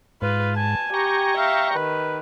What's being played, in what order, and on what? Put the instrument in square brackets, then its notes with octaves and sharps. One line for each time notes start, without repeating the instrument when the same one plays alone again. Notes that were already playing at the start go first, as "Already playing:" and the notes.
[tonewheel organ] G#2 [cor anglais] F4 [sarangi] B4
[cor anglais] G#5 [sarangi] A5
[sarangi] G4 [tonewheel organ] G5 A#5 C#6
[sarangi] E5 [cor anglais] F5
[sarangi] D#3 [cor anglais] B4